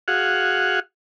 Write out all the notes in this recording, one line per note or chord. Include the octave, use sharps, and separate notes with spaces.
F#4 G#4 F5 F#5